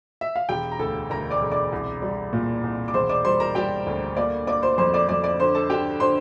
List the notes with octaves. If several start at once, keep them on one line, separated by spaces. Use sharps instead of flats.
E5
F5
E1 G4 G5
A#5
D2 A4 A5
D2 A#4 A#5
D5 D6
E1
D5 D6
C2
G3
A#2
C2
D6
E1 C5 C6
D5 D6
G3 C5 C6
A#4 A#5
G3 G4 G5
D2
A#3 D5 D6
A#3 D5 D6
C5 C6
F2 C5 C6
D5 D6
F2 D5 D6
D5 D6
D3 C5 C6
A4 A5
D3 G4 G5
D3 C5 C6